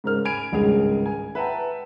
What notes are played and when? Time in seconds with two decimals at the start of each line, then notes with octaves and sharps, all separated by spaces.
0.04 G#2 C#3 A#4 C5 F6
0.25 G#5 B5 G#6 D7 F7
0.52 G#1 C#2 G2 C#3 G#4 F7
1.06 G#5
1.35 B4 E5 F#5 G5 A5 A#5